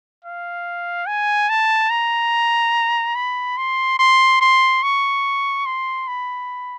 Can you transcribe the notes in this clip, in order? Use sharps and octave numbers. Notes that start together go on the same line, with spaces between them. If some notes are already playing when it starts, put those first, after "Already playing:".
F5
G#5
A5
A#5
B5
C6
C6
C6
C#6
C6
B5